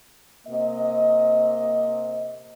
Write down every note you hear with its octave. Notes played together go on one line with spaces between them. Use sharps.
C3 A#3 D#5